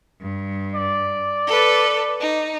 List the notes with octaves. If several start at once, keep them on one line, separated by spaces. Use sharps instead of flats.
G2
D5
A4 B4
D#4